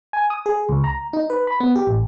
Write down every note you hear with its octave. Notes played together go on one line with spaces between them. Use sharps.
G#5
D#6
G#4
C#2
A#5
D#4
B4
B5
B3
G4
A1